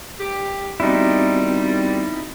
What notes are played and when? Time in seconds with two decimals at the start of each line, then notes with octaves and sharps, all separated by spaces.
0.20 G2 G4
0.80 D#3 G3 B3 C4 D#4 E4 F#4